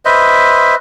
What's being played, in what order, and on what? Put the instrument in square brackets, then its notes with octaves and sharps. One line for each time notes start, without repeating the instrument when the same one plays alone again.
[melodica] B4 C5 D#5 E5